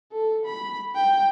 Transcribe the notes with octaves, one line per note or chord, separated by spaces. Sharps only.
A4
B5
G5